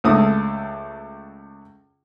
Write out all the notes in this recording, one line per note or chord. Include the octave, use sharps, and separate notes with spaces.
C#2 A3 D#6